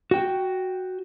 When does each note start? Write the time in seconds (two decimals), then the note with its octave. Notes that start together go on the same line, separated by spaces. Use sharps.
0.11 F#4 G5